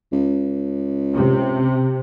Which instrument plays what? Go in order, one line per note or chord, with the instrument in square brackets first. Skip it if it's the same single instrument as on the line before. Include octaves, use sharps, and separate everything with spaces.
[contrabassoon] C#2
[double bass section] C3